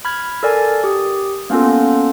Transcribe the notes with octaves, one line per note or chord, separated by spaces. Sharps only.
B5 F6 G#6
A4 A#4 D5 G#5
G4 D#6
A#3 B3 C#4 F4 A4